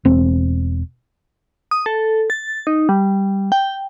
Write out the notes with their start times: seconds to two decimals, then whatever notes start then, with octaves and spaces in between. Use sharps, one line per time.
0.05 E1 C4
1.71 D#6
1.86 A4
2.30 A6
2.67 D#4
2.89 G3
3.52 G5